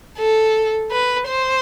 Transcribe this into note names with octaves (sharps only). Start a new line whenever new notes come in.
A4
B4
C5